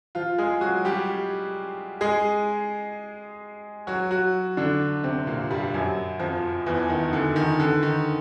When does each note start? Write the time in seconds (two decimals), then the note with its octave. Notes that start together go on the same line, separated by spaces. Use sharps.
0.15 F3 F4
0.38 G#3 G#4
0.61 F#3 F#4
0.85 G3 G4
2.01 G#3 G#4
3.87 F#3 F#4
4.11 F#3 F#4
4.57 D3 D4
5.04 C3 C4
5.27 A#2 A#3
5.50 G2 G3
5.74 F#2 F#3
6.20 F2 F3
6.66 E2 E3
6.90 D#3
7.13 D3
7.36 D#3
7.60 D3
7.83 D#3